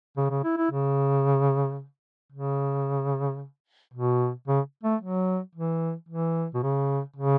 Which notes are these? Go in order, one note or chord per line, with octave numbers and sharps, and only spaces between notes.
C#3
C#3
E4
E4
C#3
C#3
B2
C#3
A3
F#3
E3
E3
B2
C#3
C#3